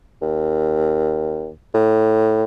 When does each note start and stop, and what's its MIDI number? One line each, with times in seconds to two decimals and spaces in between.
0.22 1.50 39
1.74 2.43 45